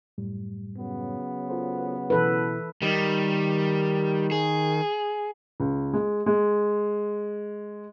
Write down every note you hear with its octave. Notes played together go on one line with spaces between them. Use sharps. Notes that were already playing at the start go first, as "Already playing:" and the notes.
F#2 A2 G3
C#3 F#3 B3
F4 A4 C5
B2 E3 E4 A4 B4
D#3 G3
G#4
C#2
G#3
G#3